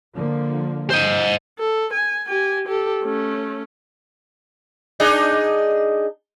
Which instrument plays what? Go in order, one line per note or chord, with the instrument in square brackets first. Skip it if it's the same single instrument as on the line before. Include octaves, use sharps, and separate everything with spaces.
[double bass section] D3 F3 A#3
[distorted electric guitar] C5 D#5
[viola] A4
G#5
G4 G#5
G4 A4
A3 C#4
[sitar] D4 D#4 G#4